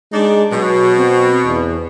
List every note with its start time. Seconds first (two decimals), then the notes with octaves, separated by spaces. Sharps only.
0.13 G#3 D4 D#4 D5
0.51 B2 F#3
0.96 C4
1.45 E2